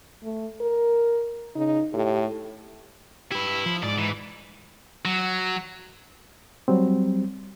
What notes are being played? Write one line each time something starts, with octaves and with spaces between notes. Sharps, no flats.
A3
A#4
C#3 D#4
A2 G4
E4 G4 B4
F3
G#2 D5
E3
F#3
F#3 G3 C4